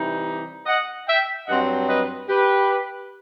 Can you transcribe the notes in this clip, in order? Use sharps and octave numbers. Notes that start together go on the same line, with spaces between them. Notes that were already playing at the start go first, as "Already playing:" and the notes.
Already playing: C3 E3 G3 D#4
D#5 F#5
E5 G5
G2 F#3 C4 D#5 F#5
B4 D#5
G4 B4